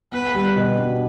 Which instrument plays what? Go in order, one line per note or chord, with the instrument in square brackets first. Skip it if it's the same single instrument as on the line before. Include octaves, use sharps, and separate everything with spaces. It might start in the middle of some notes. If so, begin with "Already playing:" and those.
[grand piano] B3 [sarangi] B4
[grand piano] G3
B2
D4